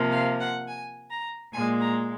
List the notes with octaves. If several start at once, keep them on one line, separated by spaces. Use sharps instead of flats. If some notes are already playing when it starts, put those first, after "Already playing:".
Already playing: C3 F3 A#3
F5
F#5
G#5
A#5
A#2 G#3 G#5
A#5